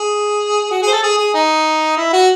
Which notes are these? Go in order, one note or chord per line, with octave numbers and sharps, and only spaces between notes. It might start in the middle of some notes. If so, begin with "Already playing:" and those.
Already playing: G#4
F#4
G#4 C5
A4
G#4
G#4
D#4
E4
F#4